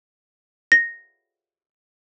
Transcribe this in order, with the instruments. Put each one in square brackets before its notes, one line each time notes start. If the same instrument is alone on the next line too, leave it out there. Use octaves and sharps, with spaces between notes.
[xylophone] A#6